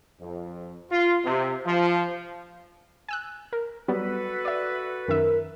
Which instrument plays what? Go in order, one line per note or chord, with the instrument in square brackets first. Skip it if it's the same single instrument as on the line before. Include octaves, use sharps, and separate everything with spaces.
[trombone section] F2
F4
C3
F3
[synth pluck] G#5 E6 F#6
A#4
[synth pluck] F#3 G3 B3 [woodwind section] F#4 A4 B4
[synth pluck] D5 E5
[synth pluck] F#2 D#3 E5 [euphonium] A#4